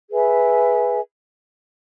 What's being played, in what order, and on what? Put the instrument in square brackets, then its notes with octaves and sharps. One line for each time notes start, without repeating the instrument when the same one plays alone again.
[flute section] G#4 B4 E5 G#5